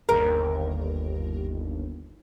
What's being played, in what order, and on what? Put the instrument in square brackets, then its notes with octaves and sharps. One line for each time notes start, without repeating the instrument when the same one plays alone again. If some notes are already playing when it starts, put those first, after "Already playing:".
[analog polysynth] G1 D#2 [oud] A#4